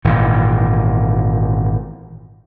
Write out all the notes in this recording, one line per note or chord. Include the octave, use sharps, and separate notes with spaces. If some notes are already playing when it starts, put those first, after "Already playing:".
G#1 A#2 E3